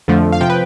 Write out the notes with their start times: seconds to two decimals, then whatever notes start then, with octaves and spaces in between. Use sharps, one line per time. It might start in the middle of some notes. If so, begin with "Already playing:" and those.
0.08 F2 D3 F3 A3
0.32 F5
0.41 C3 F3 G5
0.50 B4